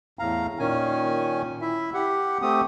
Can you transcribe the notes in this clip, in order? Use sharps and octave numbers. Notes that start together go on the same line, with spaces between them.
E2 A2 F5 A#5
A#2 D#3 C#4 G#5
E4 E5
G4 F#5
A3 C4 G4 D#6